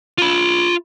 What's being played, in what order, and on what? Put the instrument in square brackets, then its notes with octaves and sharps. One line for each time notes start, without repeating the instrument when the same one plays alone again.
[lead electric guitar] F4 B5